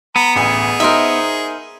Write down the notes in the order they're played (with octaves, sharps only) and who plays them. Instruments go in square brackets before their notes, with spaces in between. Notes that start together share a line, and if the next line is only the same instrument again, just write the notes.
[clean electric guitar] B3 [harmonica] A#5 B5
[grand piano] A1 D2 [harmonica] G#4
[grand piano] D#4 [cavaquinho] A#4 C5 E5